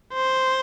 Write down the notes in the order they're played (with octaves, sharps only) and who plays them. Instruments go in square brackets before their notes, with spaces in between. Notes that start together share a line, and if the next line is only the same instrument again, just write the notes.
[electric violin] C5